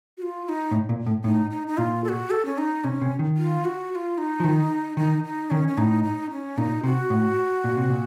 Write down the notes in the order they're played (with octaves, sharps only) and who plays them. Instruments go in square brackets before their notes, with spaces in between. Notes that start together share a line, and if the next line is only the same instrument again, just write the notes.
[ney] F#4
F4
F4
D#4
[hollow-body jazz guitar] A2
A#2
A2
[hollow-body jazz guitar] A2 [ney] D#4
[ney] D#4
D#4
[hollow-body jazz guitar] A#2 [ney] F4
[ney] A4
F#4
A4
C#4
D#4
[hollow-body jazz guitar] C3 [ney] C#4
[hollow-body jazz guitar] C3
D#3
[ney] F4
F#4
F#4
F4
D#4
[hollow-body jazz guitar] F3
D#3
[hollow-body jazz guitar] D#3 [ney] D#4
[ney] D#4
[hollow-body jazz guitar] D#3 [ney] C#4
[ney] C#4
[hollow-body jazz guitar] A2 [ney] D#4
[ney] D#4
C#4
[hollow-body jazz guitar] A#2 [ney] D#4
[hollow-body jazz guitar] C3 [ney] F#4
[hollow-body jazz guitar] A2
A#2
C3
A#2